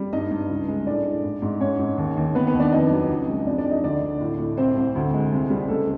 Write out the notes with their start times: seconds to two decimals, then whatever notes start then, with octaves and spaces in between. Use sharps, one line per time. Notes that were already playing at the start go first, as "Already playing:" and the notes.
Already playing: G3
0.13 G2 D#4 D#5
0.31 G2
0.50 C#2
0.68 G#3
0.86 A2 D4 D5
1.05 A2
1.24 G#2
1.42 G#2
1.60 G#2 C#4 C#5
1.79 G#2
1.98 D#2
2.17 D#2
2.35 D#2 B3 B4
2.47 B3 B4
2.53 D#2
2.60 D4 D5
2.72 F2 D#4 D#5
2.91 F#3
3.10 C#2
3.28 G#3
3.46 F2 D4 D5
3.58 D4 D5
3.65 F2
3.71 D#4 D#5
3.83 D2 D4 D5
4.02 D2
4.21 A2
4.39 A2
4.57 C2 C4 C5
4.77 C2
4.95 D2
5.13 G#3
5.32 C2
5.50 G3
5.69 C#2 A3 A4